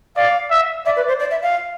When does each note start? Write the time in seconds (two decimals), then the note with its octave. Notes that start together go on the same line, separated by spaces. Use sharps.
0.16 D5 F5
0.51 E5
0.85 D5 E5
0.97 B4
1.08 C5
1.20 D5
1.31 E5
1.42 F5